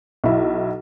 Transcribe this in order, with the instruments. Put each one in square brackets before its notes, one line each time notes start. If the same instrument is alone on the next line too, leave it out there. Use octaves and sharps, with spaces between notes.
[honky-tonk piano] B1 E4